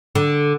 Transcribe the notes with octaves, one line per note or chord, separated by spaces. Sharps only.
D3